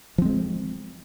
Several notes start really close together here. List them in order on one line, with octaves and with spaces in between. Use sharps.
F3 C4 G#3